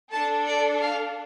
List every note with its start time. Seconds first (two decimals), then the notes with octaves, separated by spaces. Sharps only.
0.11 D4 A4 A5
0.47 D5
0.81 F5